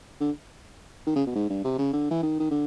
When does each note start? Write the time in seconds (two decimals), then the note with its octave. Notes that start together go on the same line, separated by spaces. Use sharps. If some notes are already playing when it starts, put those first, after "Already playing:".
0.20 D3
1.07 D#3
1.16 C#3
1.26 B2
1.35 G#2
1.50 G2
1.65 C3
1.78 C#3
1.93 D3
2.11 E3
2.23 D#3
2.40 D#3
2.51 D3